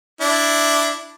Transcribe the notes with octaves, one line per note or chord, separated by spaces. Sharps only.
D4 E4